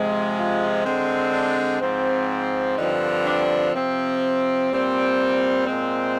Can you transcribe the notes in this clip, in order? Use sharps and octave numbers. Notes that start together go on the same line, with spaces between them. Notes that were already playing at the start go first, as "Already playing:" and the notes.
Already playing: C3 F3 G#3
F4
D3 G#3 C4
D4
G#2 F3 C4
G2 D3 F3 C4 D#4
D4
C3 F3 C4
A#2 G3 C4
A#2 G#3 C4